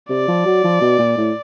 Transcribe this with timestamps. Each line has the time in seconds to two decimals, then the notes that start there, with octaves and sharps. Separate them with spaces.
0.09 C3 D5
0.28 F3
0.46 F#3
0.64 F3
0.81 B2
0.99 A#2
1.18 A2